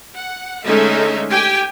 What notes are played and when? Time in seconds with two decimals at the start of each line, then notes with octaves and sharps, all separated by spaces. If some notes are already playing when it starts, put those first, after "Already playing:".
0.16 F#5
0.66 D3 G#3 A3 C#4 D#4 E5
1.31 G4 G5 G#5